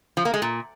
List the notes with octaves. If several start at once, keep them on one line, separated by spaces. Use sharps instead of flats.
F3
A#3
G#3
A#2